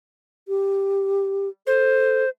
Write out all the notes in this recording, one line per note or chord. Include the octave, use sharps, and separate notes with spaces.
G4
A4 C5